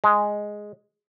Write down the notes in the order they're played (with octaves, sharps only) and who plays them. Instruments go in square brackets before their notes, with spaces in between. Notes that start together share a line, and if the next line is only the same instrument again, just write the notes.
[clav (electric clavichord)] G#3